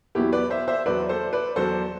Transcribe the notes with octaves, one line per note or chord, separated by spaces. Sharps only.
E2 B2 F#3 E4 G4
B4 D5
C5 E5
C5 E5
E2 B2 F#3 B4 D5
A4 C5
B4 D5
E2 B2 F#3 A4 C5